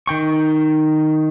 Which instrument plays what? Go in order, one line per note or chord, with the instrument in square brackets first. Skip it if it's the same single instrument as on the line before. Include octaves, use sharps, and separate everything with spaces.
[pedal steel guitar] D#3 G5 C#6